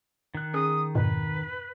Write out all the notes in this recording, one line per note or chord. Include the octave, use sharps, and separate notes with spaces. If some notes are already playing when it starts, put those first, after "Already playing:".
D#3 F#6
C#4 G#4 D#6
F2 G#2 B2 B4